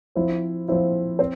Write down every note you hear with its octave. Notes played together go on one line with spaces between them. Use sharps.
F3 C4 E4
F3 C4 E4
C4 C5